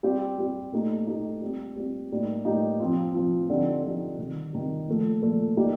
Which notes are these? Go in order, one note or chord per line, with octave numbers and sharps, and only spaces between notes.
G3 C4 G4
G3 C4 G4
A#2 A3 D#4 G4
A#2 A3 D#4 G4
G3 C4 G4
G3 C4 G4
A2 G3 A#3 D#4 G4
A2 G3 A#3 D#4 G4
F3 C4 F4
F3 C4 F4
D3 F3 C4 D#4 G4
D3 F3 C4 D#4 G4
C3 D#3 G3
C3 D#3 G3
A#2 F3 A3
A#2 F3 A3
G3 A#3 D#4 G4